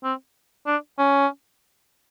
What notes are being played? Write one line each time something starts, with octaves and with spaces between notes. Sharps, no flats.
C4
D4
C#4